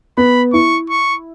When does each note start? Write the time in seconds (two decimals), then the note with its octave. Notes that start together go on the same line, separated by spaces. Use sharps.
0.17 B3 B5
0.53 E4 C#6
0.90 C#6